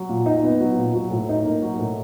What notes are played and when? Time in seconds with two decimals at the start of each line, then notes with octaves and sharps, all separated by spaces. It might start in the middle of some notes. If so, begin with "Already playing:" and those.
Already playing: F#3
0.09 A#2
0.26 D#4
0.44 B3
0.61 F#3
0.77 A#2
0.94 F#3
1.11 A2
1.29 D#4
1.45 A#3
1.62 F#3
1.79 A2